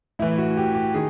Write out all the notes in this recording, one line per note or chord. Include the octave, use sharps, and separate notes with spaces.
A2 E3 E4
F#4
G4
G4
D#3 G#4